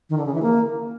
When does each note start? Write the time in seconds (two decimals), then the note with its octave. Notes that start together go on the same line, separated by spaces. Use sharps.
0.10 D#3
0.18 D3
0.26 C#3
0.34 E3
0.42 A#3